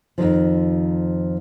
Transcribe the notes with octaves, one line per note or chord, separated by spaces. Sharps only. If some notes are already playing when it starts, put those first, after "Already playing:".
F2 A#2 D#3 F3